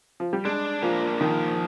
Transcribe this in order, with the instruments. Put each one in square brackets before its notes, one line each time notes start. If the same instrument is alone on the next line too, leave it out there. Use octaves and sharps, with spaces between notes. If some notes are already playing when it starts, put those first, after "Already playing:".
[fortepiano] F3
G3
[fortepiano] G#3 [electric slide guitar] D4
[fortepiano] F3 [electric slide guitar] A#3
[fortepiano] D#3 [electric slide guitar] F3